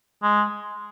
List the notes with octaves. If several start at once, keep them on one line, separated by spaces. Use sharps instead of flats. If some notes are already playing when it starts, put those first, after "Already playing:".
G#3